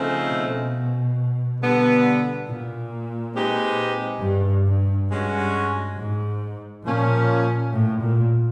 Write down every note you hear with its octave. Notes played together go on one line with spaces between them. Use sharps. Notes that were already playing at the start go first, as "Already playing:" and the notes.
Already playing: C#3 F3 A3 C4 D#4
B2
D3 G3 B3
A#2
G#3 C4 D#4 G4 B4
G2
G2
G2 G#3 C#4 F#4
G#2
A#2 F3 A#3 C#4
A2
A#2